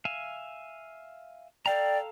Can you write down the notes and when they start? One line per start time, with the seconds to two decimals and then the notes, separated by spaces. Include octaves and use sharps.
0.05 E5 F5 G#5
1.66 A4 D5 F5 G5 A#5